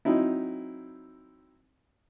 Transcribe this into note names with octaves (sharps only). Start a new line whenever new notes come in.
F#3 C4 D#4 E4